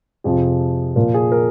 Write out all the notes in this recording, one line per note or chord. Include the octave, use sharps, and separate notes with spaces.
F2 C3 F3 G#4
A#2 F3 A#4
G#4
A#4